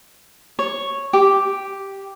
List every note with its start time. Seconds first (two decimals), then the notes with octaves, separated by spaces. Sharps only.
0.59 C#5
1.13 G4